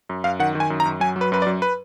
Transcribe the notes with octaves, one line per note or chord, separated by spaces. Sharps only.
F#2
F#2 F5
D#3 F#5
D#3
G#5
F#2
A#5
F#2
F#3 G#5
F#3
B4
F#2 B4
D5
F#2
B4